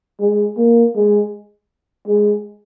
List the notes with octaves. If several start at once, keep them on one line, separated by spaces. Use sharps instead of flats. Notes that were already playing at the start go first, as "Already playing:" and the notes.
G#3
A#3
G#3
G#3